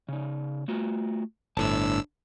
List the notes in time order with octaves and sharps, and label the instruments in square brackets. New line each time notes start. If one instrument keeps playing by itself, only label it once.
[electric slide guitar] C#3 D#4
A3 F4 F#4
[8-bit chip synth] G1 A2 E6 [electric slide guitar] D4 C5 A5